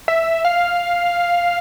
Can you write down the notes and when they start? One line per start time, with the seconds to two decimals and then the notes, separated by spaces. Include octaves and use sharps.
0.08 E5
0.45 F5